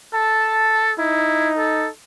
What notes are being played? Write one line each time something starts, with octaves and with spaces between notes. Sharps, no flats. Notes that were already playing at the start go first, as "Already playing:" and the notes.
A4 A5
D#4 E4
A4